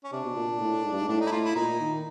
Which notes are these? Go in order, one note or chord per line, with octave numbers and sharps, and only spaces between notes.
C#4
C3 D4
B2
A#2
A2
G#2
G2
G#2
A2 D4
D#4
E4
A2 F4
E4
A#2 D#4
D#3